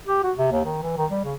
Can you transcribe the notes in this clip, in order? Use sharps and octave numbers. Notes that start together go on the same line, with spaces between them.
G4
F#4
C3
D#2
D#3
E3
D#3
G3
C#3